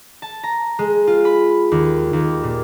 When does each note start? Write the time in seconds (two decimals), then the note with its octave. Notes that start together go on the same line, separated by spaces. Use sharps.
0.22 A5
0.43 A#5
0.79 G#3
1.07 F4
1.25 B5
1.72 D#2
2.13 D#2
2.43 A#2